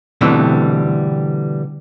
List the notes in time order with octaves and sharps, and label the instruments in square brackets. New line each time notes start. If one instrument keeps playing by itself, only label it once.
[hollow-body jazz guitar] B2 D3 E3 G3 A3 C4